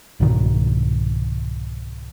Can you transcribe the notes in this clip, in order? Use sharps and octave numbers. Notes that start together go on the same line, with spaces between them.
C2 G#2 B2 D#3